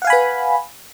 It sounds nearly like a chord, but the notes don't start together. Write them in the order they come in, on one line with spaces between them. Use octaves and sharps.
F#5 F5 G#5 B5 B4